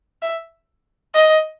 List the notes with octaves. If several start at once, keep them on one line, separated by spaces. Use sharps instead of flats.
E5
D#5